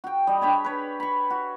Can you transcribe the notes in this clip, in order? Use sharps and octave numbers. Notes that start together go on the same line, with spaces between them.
F#4 G5
G3 D#5
D4 G4 C#5 G#5
B4 C#5
B5 C#6
F#4